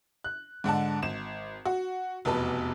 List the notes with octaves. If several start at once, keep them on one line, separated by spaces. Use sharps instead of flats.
F#6
G#2 D3 F#5 A5
G#1 E7
F#4
F1 E2 B2 B4 A5